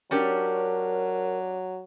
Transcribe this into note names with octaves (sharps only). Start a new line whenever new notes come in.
F#3 C#4 D4 G4 A#4